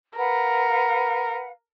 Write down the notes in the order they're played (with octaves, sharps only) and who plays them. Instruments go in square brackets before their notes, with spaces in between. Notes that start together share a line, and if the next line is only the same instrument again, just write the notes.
[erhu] A#4 [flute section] B4 F5 F#5